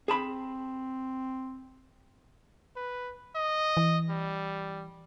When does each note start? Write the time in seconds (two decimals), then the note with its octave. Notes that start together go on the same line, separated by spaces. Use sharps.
0.08 C4 G#4 A5 B5
2.76 B4
3.36 D#5
3.77 E3
4.10 G3